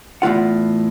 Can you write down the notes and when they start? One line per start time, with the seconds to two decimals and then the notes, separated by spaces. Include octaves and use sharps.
0.22 E2 A2 E3 F4 F#5